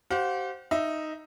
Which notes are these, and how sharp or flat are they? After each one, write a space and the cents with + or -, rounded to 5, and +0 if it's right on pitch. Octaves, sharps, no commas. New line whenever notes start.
G4 -35 C5 +0 F5 +45
D#4 +0 E5 +0